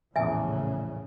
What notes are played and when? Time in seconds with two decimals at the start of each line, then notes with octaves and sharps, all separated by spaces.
0.16 A#1 E2 A2 C#3 E5 G#5